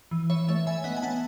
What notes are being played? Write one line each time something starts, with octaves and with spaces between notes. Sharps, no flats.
E3
E3 C#5 E5
A3 C#5 E5
E3 E5 G#5
B3 D#5 F#5
G#5
B3 F#5 A5